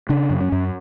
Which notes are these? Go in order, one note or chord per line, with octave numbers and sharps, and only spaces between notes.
C#3 D4
F#2
C#4
F#2